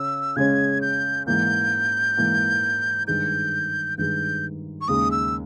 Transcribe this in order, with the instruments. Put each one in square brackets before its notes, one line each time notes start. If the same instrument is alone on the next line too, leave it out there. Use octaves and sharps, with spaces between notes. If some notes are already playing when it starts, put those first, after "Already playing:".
Already playing: [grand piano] C#3 C#4 [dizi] E6
[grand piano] C#3 G#3 C#4 [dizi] G#6
[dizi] G6
[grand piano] G#2 E3 A#3 [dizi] G6
[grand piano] G#2 E3 A#3
[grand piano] G2 D#3 G#3 [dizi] G6
[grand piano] G2 D#3 G#3 [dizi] G6
[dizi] C#6
[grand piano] D#2 C#3 G#3 D#4 [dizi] D#6
[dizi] E6